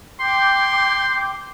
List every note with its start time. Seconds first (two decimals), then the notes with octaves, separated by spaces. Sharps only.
0.20 G5 C6 D6 G6